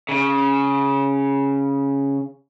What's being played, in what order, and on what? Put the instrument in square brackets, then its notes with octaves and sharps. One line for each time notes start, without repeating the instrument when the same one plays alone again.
[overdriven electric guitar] C#3